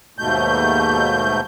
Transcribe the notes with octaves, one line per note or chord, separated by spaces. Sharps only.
D#2 G#2 B2 A3 G6